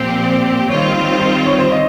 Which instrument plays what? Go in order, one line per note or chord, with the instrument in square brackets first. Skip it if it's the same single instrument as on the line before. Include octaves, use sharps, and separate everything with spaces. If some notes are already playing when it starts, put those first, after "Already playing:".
Already playing: [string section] A#2 F3 C4 G4
[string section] D#3 G3 C4 F4 [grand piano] C#5
[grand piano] C5
C#5
C5
D#5